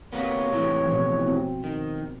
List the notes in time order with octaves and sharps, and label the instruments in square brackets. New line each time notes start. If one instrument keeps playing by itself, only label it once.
[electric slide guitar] C3 A#3 B3 [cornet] C#5
[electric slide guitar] A2 C3 E3
[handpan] B2 F3
C4
[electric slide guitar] D#3